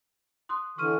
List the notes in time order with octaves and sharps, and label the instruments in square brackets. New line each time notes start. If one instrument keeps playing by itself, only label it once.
[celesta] C6 D#6 F#6
[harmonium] D3 E3 [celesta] C#6 F6 D#7